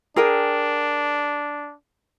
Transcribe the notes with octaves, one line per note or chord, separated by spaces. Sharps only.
D4 G#4 A#4 G5